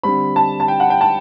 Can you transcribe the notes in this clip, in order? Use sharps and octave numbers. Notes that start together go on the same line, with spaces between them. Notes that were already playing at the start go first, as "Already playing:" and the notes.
D3 G3 C4 B5
A5
A5
G5
F#5
G5
A5